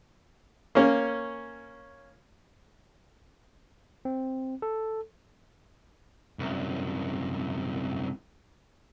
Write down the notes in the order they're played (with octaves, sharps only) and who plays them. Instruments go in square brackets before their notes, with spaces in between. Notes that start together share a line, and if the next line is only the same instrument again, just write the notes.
[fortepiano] A#3 C#4
[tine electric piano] C4
A4
[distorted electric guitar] C2 F#2